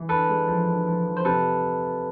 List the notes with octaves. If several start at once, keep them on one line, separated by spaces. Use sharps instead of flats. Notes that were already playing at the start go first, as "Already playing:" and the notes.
Already playing: E3
D3 A4 B4
G#3
F3
D3
F3
F3
C5
C3 A4 B4